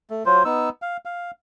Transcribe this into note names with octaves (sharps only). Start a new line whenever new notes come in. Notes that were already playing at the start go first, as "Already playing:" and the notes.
A3
F#3 F4 C5
B3 D#4 E6
F5
F5